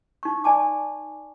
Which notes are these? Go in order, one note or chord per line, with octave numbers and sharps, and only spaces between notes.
D#4 C#6
D5 G#5 A5 D6